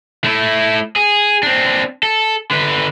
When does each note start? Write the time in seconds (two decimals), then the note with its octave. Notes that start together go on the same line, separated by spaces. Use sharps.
0.24 A3 E4
0.96 G#4
1.43 C4 D4
2.03 A4
2.51 D3 B4